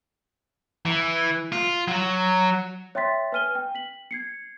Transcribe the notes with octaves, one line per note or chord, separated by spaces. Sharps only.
E3
F4
F#3
C#5 E5 G5 C6 A6 B6
B4 G#5 F6 D#7 G7
G5
B6 F#7
G#6 C7 C#7